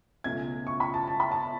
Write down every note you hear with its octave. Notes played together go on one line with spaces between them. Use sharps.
C#2 B2 A3 C#4 G#6
C#6
B5
A5
A5
B5
A5